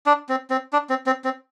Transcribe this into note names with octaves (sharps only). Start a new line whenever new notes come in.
D4
C4
C4
D4
C4
C4
C4